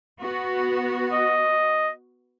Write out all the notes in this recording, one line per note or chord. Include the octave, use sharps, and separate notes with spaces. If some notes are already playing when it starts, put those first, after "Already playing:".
B3 F#4
D#5